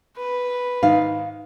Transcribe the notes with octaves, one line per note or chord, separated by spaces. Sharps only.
B4
G#2 D#3 F5